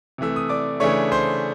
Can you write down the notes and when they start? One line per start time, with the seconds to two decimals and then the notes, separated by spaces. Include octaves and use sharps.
0.18 C3 E3 A3 E6
0.36 D#6
0.49 D5 D6
0.80 C#3 E3 A3 D4 C#5 C#6
1.12 C5 C6